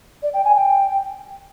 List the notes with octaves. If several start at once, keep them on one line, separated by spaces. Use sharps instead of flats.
D5
G5
G#5
G5